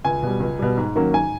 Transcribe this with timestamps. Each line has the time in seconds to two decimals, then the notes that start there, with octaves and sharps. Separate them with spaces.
0.04 C#2 G#5
0.23 B2 G3
0.40 C#2
0.59 B2 G3
0.78 G#2
0.95 D#3 F#3 A#3 C#4
1.14 G#2 G#5